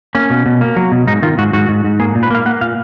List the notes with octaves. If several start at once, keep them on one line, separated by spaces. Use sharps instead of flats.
A#3 C#4
B2
B2
A#3
F#3
B2
G#2 D#4
D#3 F4
G#2 F#4
G#2 F#4
G#2
G#2
A#3 G#4
A#2
B4
A#3 F5
A#3 F#5
A#2 F5